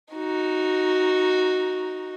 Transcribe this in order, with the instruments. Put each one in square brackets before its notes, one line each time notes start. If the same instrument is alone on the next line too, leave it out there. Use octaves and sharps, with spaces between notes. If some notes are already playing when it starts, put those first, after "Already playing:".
[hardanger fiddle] D#4 F#4